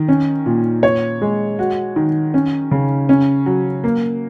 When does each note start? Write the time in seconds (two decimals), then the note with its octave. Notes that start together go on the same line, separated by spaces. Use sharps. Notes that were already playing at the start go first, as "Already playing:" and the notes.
Already playing: D#3
0.08 C#4
0.46 A#2
0.83 C#5
1.22 G#3
1.59 F#4
1.96 D#3
2.34 C#4
2.71 C#3
3.09 C#4
3.46 F#3
3.84 A#3